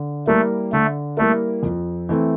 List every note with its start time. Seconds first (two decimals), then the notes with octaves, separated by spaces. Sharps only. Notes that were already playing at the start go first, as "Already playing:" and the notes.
Already playing: D3
0.27 G3 A3 A#3 E4 A#4
0.72 D3 A3
1.17 G3 A3 A#3 E4 A#4
1.63 F2
2.09 E3 A3 C4